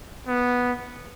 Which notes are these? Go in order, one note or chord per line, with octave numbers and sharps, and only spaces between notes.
B3